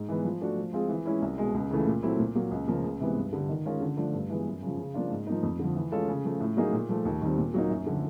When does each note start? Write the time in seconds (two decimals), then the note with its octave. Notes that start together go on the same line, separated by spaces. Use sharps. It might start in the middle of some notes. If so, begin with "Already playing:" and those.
Already playing: G#2
0.09 E3 G#3 B3
0.24 F3
0.41 A3 D4 F#4
0.57 F3
0.73 G#3 C4 F4 G#4
0.89 E3
1.05 G#3 C#4 E4
1.22 C2
1.38 B2 G#3
1.54 C#2
1.70 C#3 E3 A3
1.86 A#2
2.03 F#3 A3 C4 E4
2.19 A#2
2.35 F#3 A#3
2.51 C#2
2.68 C#3 F3 A#3
2.84 C#2
3.00 C3 E3 G#3 B3
3.16 G2
3.33 D3 G3
3.49 D#3
3.65 G#3 C#4 F4 A#4
3.81 D3
3.97 F3 A3 D4
4.14 G2
4.30 E3 G#3 B3
4.46 F#2
4.62 C#3 F3
4.78 C#3
4.94 F3 A#3 D4 F4
5.10 G#2
5.27 F3 A#3 D#4
5.43 F2
5.59 D3 F3
5.76 E3
5.92 G#3 C#4 F4 A4
6.08 C#3
6.24 F3 A3
6.40 A2
6.57 F#3 A#3 D#4 G#4
6.73 A#2
6.89 F3 A3
7.05 D#2
7.22 D#3 G3 C4
7.37 A#2
7.54 F#3 A#3 D#4
7.70 F#2
7.86 D3 F3